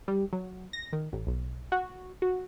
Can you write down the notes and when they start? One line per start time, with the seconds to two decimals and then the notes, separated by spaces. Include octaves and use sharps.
0.08 G3
0.33 F#3
0.73 A#6
0.93 D#3
1.13 A1
1.27 B1
1.72 F#4
2.22 F#4